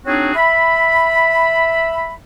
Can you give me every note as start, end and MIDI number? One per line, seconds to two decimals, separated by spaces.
0.06 0.33 60
0.06 0.33 62
0.06 0.33 63
0.06 0.33 66
0.06 0.33 68
0.06 0.33 73
0.35 2.13 76
0.35 2.13 83